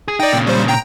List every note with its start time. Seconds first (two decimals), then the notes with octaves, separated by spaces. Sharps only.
0.08 G#4
0.20 D#4 D5 G5
0.33 A#2 C#3
0.47 G3 C5
0.68 G5 A#5